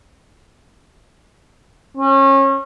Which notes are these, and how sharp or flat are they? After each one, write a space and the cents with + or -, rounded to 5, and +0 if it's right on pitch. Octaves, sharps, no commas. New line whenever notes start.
C#4 -30